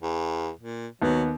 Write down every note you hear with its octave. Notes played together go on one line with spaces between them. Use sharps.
E2
A#2
D#2 F#3 B3